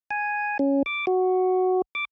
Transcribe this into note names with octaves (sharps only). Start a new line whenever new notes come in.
G#5
C#4
D6
F#4
D6